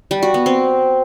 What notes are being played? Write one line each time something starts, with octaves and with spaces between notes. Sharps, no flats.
G3
F#4
B3
C4